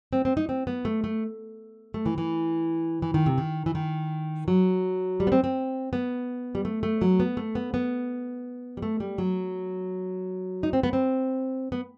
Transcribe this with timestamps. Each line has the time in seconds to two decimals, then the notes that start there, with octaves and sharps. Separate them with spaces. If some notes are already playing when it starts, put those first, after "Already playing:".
0.13 C4
0.25 C4
0.37 D#4
0.49 C4
0.67 B3
0.85 A3
1.04 A3
1.94 A3
2.06 E3
2.18 E3
3.02 E3
3.14 D#3
3.26 C3
3.38 D#3
3.66 E3
3.75 D#3
4.48 F#3
5.20 G3
5.27 B3
5.32 C4
5.44 C4
5.93 B3
6.55 G3
6.65 A3
6.83 A3
7.02 F#3
7.20 B3
7.37 A3
7.55 B3
7.74 B3
8.77 G3
8.82 A3
9.00 G3
9.18 F#3
10.63 D#4
10.73 C4
10.83 B3
10.93 C4
11.72 B3